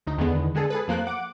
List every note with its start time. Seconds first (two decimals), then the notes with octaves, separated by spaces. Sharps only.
0.07 D2 D#4
0.18 E2 D3 D#3 G#3 B3
0.55 D3 G#3 G#4 A4
0.70 G#4 A4 B4
0.88 F2 F3 A#3 F#6
1.07 F#5 D6